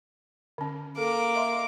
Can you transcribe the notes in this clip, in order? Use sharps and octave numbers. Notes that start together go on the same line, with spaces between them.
D3 C#4
A#3 A4 D6
D#5 E5 C6